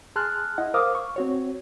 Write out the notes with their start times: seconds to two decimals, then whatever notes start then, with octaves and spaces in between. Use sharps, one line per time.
0.16 G#4 A5 C6 F6 F#6
0.58 E4 D#5 F#5
0.74 A#4 C5 F5 D6 D#6 F6
0.95 C#6
1.16 C4 F#4 C#5